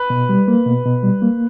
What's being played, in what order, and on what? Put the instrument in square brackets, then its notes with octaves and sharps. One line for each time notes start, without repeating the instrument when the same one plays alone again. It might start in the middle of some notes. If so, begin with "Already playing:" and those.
Already playing: [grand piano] B4
[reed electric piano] B2
G3
A#3
B2
B2
G3
A#3